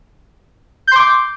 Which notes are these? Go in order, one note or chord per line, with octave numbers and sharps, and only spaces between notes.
C6 D6 G6